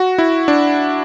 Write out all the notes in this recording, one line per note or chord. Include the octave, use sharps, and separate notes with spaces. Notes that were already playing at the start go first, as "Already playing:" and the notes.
Already playing: F#4
E4
D4